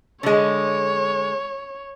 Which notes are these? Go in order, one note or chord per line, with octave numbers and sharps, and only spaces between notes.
D3 G#3 C#5